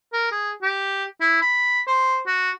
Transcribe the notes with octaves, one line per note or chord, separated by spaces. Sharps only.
A#4
G#4
G4
E4
B5
C5
F#4